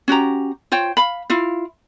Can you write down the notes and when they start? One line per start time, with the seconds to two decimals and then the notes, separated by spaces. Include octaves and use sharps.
0.08 C#4 F#4 G4 A#5
0.72 F4 C5 C#5 G5
0.97 F5 B5
1.30 E4 F4 F5